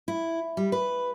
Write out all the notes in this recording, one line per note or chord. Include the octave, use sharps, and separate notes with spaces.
E4
G3
B4